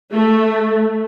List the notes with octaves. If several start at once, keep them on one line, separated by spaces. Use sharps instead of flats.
A3